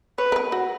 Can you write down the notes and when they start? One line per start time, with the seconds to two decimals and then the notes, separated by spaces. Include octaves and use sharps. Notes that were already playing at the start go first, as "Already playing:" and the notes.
0.18 B4 C#5
0.32 A#4
0.36 B4
0.52 F#4